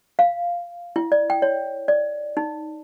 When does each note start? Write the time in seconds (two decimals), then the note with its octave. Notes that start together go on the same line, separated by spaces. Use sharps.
0.19 F5
0.96 E4
1.12 D5
1.30 G5
1.42 C#5
1.88 D5
2.37 D#4